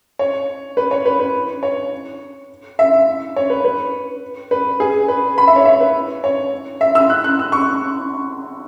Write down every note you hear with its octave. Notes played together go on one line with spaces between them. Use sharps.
C#5
B4
C#5
B4
B4
C#5
E5
C#5
B4
B4
B4
G#4
B4
B5
E5
C#5
E5
B4
C#5
E5
E6
F#6
F#6
E6
C#6